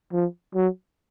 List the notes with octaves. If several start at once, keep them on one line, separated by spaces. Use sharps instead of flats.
F3
F#3